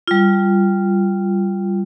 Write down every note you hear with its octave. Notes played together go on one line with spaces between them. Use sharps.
G3 F4